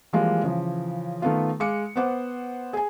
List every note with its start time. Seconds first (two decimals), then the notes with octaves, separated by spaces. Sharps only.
0.13 E3 F3 G3 G#3 A#3 F4
0.43 C#3 E3 F3
1.22 D#3 A3 B3 F4
1.60 G#3 F5 D6 C#7
1.96 B3 B4 C5 F#5 D6
2.73 G#4 G#5